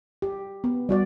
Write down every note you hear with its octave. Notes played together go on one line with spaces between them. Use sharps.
G4
B3
G3 F#4 D5